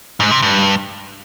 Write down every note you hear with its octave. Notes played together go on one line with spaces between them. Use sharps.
G#2
C3
G2